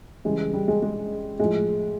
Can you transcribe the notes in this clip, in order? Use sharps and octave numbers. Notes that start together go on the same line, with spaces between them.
C#3 E3 G3 G#3
G3
G#3
G#3
A2 F3 G#3